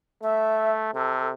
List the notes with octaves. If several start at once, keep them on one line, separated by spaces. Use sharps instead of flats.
A3 E5
C3 A4